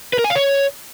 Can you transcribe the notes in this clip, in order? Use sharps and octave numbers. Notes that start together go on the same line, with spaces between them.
B4
A#4
G#5
F5
C#5